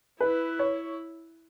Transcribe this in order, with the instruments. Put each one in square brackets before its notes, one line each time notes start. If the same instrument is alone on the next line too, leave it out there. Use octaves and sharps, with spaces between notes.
[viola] E4 [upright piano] B4
[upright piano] C#5